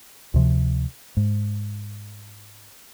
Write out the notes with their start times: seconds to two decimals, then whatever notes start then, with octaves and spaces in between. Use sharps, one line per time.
0.34 D2 C3 F3
1.17 G#2